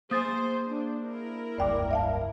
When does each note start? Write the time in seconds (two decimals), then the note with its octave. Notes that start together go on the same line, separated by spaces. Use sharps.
0.11 A#3 G#4 C5 G#5 D#6 A6
0.68 D4
1.04 E4 A#4
1.58 F1 C#2 G2 D5 G5 D6
1.91 E5 F5 A5